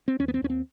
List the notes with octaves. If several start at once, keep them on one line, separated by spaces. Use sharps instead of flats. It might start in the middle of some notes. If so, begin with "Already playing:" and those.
C4
D#2 C#4
B3
C4
D#2 C#4
C4